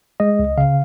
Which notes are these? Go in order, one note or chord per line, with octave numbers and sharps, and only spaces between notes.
G#3 D#5
C#2
C#3 F5